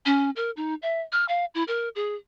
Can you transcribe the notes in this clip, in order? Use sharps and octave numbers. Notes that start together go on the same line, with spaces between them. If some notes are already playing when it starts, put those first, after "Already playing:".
C#4
A#4
D#4
E5
F6
F5
E4
A#4
G#4